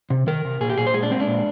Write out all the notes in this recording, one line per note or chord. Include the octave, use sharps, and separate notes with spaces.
C3
D#3 A#4
C3
A#2 G#4
G4
A#2 G#4
C5
G#3 G#4
D4
G#3 C4
D4
A#2